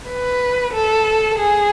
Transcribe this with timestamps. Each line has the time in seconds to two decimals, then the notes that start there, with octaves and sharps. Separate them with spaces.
0.09 B4
0.74 A4
1.38 G#4